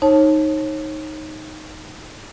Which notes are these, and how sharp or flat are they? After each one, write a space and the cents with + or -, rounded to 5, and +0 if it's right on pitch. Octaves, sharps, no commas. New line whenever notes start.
D#4 +0 C#5 -35 A5 +0